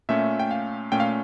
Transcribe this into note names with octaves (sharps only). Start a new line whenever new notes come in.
A#2 A3 C#4 E5
G5
F5
A#2 A3 C#4 G5
F5